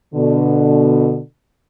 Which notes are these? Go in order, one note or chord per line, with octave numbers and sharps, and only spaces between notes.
B2 D3